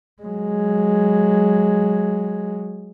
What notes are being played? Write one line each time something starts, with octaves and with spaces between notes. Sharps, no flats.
F#3 G#3